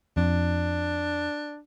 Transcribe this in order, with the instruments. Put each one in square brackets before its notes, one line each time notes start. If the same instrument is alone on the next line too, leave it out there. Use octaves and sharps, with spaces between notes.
[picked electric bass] F2 [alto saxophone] D4